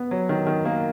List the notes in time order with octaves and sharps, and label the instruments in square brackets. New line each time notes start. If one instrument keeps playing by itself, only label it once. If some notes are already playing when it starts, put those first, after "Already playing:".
Already playing: [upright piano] B3
F#3
D#3
D#3
A#3